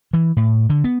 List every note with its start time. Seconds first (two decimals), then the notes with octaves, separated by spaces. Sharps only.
0.13 E3
0.37 A2
0.70 D3
0.84 B3